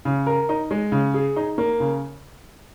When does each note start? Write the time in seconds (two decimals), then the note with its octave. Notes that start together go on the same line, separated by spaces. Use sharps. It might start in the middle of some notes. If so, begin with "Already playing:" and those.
0.05 C#3
0.27 A#4
0.49 D#4
0.71 G#3
0.92 C#3
1.14 G#4
1.36 D#4
1.58 A#3
1.80 C#3